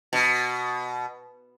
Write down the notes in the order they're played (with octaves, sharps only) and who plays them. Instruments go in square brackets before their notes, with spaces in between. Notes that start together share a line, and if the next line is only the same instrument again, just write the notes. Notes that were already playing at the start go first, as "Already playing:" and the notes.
[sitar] B2